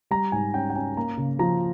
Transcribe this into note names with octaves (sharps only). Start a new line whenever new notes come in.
G3 A#5
G#2 G#5
C#4 G5
G5
C#4 G#5
A#3 A#5
C#3
F3 A#5